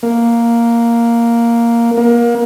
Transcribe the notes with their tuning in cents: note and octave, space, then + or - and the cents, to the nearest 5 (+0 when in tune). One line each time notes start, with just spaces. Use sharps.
A#3 +0
A#3 +25